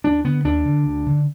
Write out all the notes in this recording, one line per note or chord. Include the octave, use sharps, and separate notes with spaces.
D#2 D4
D3 B3
D#2 D4
D3
D2
D3